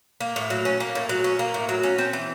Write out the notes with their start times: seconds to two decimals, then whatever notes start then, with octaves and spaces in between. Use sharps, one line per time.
0.20 A#3
0.36 A2
0.50 F#3
0.65 C#4
0.80 A#3
0.95 A2
1.09 F#3
1.24 C#4
1.39 A#3
1.54 A2
1.69 F#3
1.83 C#4
1.98 C4
2.13 E3